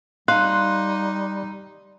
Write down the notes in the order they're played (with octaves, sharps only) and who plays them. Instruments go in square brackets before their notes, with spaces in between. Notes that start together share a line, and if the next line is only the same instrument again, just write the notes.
[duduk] G3 [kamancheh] D#4 [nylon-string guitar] F5 [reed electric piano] C6 F#6